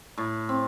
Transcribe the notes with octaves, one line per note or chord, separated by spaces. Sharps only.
A2
C4